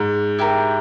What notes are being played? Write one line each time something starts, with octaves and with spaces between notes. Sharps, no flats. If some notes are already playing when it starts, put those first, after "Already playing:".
Already playing: G#2
E4 G4 A#4